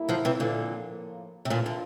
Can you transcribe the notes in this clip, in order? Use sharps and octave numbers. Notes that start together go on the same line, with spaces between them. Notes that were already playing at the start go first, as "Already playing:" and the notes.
Already playing: A2 G3 A#3 E4
D3 F3
C3 E3
A#2 D3
A2 F3 A#3
C3
A#2 D3 E3 A#3 D4 F4
D3